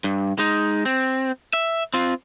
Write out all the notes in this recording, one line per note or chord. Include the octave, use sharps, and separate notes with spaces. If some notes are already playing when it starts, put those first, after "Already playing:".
G2
G#3 D#4
C4
E5
C4 F4